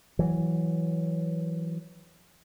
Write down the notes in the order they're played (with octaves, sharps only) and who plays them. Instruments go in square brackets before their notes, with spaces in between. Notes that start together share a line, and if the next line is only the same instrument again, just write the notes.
[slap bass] E3 F#3